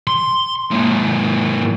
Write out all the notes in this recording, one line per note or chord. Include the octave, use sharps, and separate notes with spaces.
C6
G#2 A#3